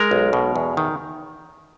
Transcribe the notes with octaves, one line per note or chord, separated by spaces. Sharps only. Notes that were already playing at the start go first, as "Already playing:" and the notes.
Already playing: G#3 A#4
B1
B2
E2
D#3